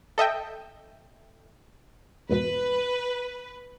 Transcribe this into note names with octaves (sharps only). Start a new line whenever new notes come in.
A4 D#5 E5 G5
E2 G#2 B2 B4